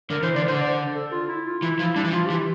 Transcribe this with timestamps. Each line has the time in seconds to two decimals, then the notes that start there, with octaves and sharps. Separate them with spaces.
0.10 D3 A#4
0.23 E3 C5
0.36 D3 D5
0.48 D3 C5
0.60 D5
0.95 A4
1.12 F4
1.28 E4
1.45 F4
1.62 E3 E4
1.79 F3 E4
1.96 G3 D4
2.05 E3
2.13 F3 F4
2.26 E3 G4